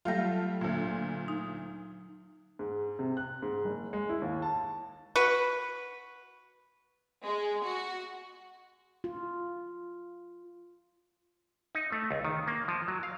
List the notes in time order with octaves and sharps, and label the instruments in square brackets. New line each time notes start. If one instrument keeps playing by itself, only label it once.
[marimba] F#3 G6 A#6 [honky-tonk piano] G3 A3 F4
[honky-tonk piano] D2 A#2
[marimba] D#4
[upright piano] G#2
C3
F#6
G#2
F#1
G#3
E4
D#2
A5
[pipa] F#4 B4
[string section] G#3
F#4
[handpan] F4
[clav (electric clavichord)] D#4
A3
C#2
D#3
A#3
F3
F#3
F5